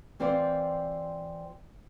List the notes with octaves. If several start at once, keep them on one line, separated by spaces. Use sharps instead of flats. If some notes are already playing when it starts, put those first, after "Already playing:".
E3 C4 F4 C5 D5